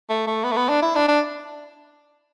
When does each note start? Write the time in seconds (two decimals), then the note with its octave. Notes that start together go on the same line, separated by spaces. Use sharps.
0.10 A3
0.27 A3
0.44 B3
0.52 A3
0.57 B3
0.69 D4
0.82 E4
0.96 D4
1.08 D4